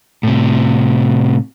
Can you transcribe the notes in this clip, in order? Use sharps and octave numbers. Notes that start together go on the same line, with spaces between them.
A2 C3